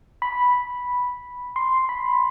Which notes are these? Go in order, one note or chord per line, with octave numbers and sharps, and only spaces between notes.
B5
C6
B5